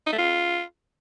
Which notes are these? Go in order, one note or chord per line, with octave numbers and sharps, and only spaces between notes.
D#4
A3
F4